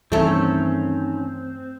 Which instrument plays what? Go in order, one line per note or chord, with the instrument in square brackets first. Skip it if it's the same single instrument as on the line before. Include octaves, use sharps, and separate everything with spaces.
[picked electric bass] G2 E3 G3 [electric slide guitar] D#3 C#4 [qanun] A3 A4 [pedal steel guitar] C4